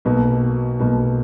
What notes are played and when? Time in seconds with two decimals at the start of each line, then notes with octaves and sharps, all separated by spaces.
0.05 B1 B2 A#3
0.79 B1 B2 A#3